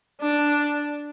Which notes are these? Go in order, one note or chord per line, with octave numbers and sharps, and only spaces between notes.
D4